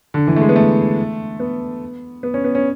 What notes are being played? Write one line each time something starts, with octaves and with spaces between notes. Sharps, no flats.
D3
E3
A3
G#3
B3
A3
B3
B3
C#4
B3
C#4